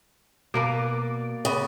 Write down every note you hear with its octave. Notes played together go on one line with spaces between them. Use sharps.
B2 A#3 A#4 B4 D5
C#3 B3